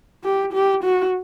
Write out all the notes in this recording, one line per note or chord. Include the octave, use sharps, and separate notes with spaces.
G4
G4
F#4